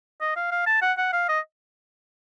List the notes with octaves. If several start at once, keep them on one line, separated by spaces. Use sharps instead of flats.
D#5
F5
F5
A5
F#5
F#5
F5
D#5